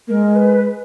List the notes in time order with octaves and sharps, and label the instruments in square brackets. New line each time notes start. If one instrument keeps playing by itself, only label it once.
[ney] G#3 A#3 [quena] A#4
[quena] B4